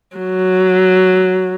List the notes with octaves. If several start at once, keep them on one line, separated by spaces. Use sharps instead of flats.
F#3